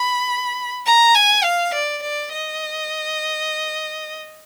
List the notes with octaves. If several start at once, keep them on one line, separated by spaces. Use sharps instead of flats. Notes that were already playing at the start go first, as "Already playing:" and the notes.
Already playing: B5
A#5
G#5
F5
D5
D5
D#5